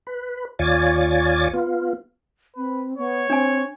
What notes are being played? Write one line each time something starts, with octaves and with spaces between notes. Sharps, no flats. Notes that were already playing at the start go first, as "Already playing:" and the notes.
B4
D#2 F4 C#5 D5 G#5 A6
B3 F4
C4 B4
B3 C#5
C4 D4 G#5